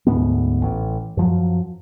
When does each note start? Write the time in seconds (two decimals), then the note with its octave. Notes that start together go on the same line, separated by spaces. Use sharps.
0.07 D2 G#2 G#3 B3
0.62 A1
1.17 F#2 F3 F#3